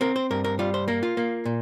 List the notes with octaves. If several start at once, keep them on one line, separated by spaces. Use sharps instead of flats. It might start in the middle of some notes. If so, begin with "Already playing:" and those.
C4 A#4
C5
G2 A#4
A#4
G3 F4
C5
A#3 A#4
F4
A#3
A#2